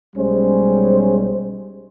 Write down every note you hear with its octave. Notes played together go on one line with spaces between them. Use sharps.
B1 G3 G#3 C#4 C5